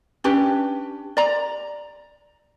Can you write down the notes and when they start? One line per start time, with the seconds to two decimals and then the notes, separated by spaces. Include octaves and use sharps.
0.24 C#4 D4 G4 B4
1.17 D5 A#5